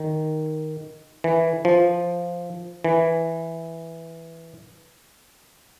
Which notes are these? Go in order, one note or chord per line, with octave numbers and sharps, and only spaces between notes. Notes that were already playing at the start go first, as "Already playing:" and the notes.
Already playing: D#3
E3
F3
E3